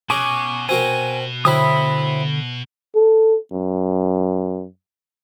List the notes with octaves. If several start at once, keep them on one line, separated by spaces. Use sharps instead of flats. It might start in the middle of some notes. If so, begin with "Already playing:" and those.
B2 C#4 G#4 G#5 C#6 D6
C4 F#4 A#4 G#5
D3 F#3 C4 E4 B5 D#6
A4
F#2